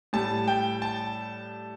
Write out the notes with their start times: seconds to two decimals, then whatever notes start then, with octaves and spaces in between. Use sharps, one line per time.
0.13 A2 G3 A5
0.48 G5
0.82 A5